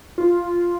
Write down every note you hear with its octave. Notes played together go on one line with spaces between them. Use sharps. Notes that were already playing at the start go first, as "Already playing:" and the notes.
F4